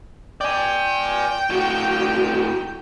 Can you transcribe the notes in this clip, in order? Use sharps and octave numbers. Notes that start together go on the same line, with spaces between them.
D5 G5 G#5
A2 F#4